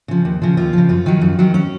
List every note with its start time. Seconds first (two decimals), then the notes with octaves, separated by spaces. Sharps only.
0.08 C#3 F3
0.25 D#2
0.42 C#3 F3
0.57 D#2 F4
0.73 C#3 F3
0.89 F#2 F4
1.06 D#3 F#3
1.21 F#2
1.39 D#3 F#3
1.54 C#4